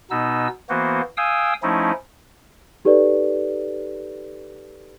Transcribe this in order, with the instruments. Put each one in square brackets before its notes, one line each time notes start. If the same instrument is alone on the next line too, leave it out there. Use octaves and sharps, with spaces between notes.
[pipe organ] B2 B3 D#4 E6
E3 A#3 B3 F#4 C5
F5 G5 G#5 D#6 E6
F3 A3 C#4 D#4 E4
[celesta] D#4 G4 A4 B4 D5